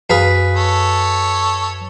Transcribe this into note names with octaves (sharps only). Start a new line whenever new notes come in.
F#2 G#4 B4 F5
A4 C#5